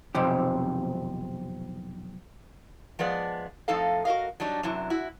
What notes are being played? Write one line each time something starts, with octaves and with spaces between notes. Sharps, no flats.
B1 F2 C3 F3 G4
F3 G#3 B3 D5
F2 A2 D#4 A4 F5
F#4 A#4 D#5 F5
F#3 G3 D4 D#4
F#2 C3 F#3 E4
E4 F#4